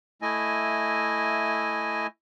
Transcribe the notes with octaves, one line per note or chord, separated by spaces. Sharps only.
A3 E4 D#5 G#5